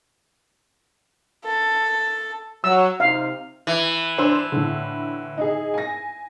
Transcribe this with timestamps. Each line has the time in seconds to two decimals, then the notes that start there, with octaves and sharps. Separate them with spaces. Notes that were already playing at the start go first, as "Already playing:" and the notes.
1.45 A4
2.64 F#3 E6
3.00 C3 D#4 F5
3.67 E3
4.18 D4 C5 E6
4.52 A2 D3
5.38 D#4 G#4
5.74 G#5 A#6